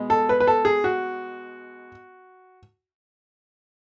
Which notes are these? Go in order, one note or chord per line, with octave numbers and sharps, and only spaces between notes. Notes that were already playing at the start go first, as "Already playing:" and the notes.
Already playing: B2 G#3
A4
B4
B4
A4
G#4
F#4